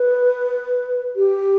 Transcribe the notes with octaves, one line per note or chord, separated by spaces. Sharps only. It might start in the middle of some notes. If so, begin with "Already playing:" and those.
Already playing: B4
G4